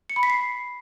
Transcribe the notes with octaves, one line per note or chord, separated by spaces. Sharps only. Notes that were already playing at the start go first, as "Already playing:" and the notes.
C#7
B5
B6
C7